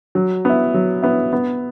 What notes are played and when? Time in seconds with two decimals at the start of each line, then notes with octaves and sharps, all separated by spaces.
0.15 F#3
0.45 B3 E4
0.74 F#3
1.03 B3 E4
1.33 B3